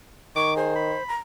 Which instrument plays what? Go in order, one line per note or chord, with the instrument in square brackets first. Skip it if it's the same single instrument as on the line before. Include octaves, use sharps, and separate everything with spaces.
[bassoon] D#3 [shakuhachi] C#6 [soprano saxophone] D6
[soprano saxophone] G#4 [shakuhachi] C5
[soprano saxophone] B5
[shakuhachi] A#5